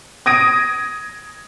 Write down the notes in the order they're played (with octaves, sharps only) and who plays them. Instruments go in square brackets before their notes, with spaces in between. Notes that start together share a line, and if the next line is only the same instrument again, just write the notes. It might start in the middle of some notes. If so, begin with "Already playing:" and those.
[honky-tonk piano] D#6 G#6 A#6 D7 D#7